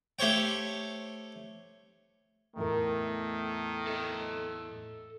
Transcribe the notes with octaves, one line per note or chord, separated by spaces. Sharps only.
A3 G4 C5 C#5 G5
E2 A2 D#3 A3 A#4
A4 D#5